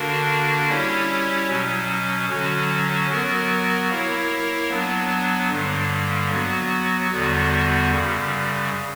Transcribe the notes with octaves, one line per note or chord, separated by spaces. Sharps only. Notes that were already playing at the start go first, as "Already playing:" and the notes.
Already playing: D3 A#3 D4 F#4 A#4
G3 C#4 E4 G4 C#5
B2 F#3 C#4
D3 F#3 C#4 F#4
F#3 B3 F#4 A#4
A#3 E4 A#4 C#5
F#3 B3 D4
G2 D3 G3 A#3
F#3 B3 F#4
E2 D3 G3 B3 F#4
F#2 C#3 G3